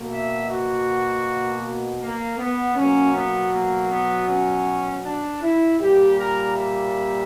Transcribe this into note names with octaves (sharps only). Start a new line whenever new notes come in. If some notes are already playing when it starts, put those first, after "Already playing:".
Already playing: B2 A#3
E5
F#4
A#3
B3
B2 F#3 A#3 C#4
B3
A#3
B3
C#4
D4
E4
A#2 G3 A#3 G4
A#4
E5